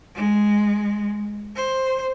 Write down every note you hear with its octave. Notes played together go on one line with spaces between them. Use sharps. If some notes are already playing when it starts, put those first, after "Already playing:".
G#3
C5